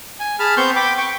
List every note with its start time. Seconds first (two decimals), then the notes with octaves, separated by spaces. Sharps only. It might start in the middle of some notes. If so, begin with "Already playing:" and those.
0.20 G#5
0.39 G#4 A5 B5 F6
0.57 B3 C4 C6 C#6 G6
0.76 G5 B5 D6
0.97 G5 C#6